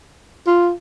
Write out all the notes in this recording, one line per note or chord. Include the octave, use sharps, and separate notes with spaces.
F4